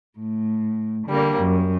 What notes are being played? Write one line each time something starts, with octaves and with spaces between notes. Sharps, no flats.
A2
D3 G3 A#3
F#2